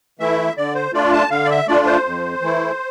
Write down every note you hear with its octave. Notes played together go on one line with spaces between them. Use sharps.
E3 A3 E4 E5
D3 D5
C5
A3 D4 F4 D5
A5
D3 F5
D5
E5
A3 D4 F4 D5
C5
F2
E3 A3 E4